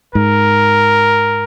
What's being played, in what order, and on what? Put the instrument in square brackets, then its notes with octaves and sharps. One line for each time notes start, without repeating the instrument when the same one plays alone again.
[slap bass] G#2 [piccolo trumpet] A#4